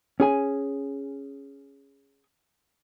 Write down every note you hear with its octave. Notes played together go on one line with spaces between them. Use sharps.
C#4 G#4 G#5